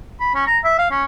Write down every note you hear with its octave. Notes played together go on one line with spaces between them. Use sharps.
B5
C#4
A#5
E5
F5
C#4